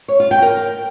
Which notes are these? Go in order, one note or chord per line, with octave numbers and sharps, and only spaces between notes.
C#5
F4
G5
A#4